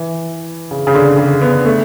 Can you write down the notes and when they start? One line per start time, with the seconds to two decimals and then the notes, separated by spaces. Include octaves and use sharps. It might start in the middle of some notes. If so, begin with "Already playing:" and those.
Already playing: E3
0.71 C#3
0.87 C#3
0.95 D3
1.18 C#3
1.42 B3
1.65 A3